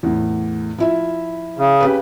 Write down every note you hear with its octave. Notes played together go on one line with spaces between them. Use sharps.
E2 A2
F3 E4 E5
C#3
C#4 G4 B4